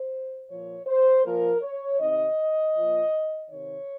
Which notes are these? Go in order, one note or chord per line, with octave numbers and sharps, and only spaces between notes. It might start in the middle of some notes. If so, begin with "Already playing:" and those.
Already playing: C5
A#2 F3 C#5
C5
A#2 F3 A#4
C#5
C3 D#3 D#5
A#2 F3
C3 D#3 C#5